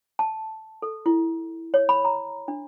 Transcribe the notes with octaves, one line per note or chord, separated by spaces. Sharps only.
A5
A4
E4
C#5
B5
A#5
D4